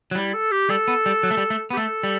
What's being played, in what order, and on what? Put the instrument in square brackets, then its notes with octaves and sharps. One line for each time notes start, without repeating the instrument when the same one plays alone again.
[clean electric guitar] F#3
[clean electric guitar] G3 [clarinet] E4
[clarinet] A4
G4
[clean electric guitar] G3 [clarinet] A4
[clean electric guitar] B3
G3
F#3
A3
G3
A3
B3
[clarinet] G4
[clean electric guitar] A3 [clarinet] A4
[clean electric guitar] G3